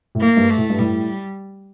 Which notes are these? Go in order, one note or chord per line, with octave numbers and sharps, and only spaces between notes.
A2
A#3
G2
A3
A2
G2
A2 G3